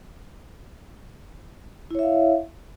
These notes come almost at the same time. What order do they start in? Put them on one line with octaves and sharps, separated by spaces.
E4 C#5 E5 F5